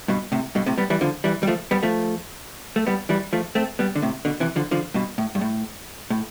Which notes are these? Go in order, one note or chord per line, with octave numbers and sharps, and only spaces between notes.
G2 B2
A2 C3
G2 B2
A2 C3
G3 B3
E3 G3
D3 F3
E3 G3
G3
F3 A3
G3 B3
F3 A3
A3
G3 B3
E3 G3
F3 A3
A3 C4
G3 B3
D3
A2 C3
B2 D3
C3 E3
D3 F3
D3 F3
G2 B2
A2
G2
A2
A2